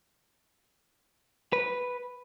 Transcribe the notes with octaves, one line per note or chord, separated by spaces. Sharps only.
B4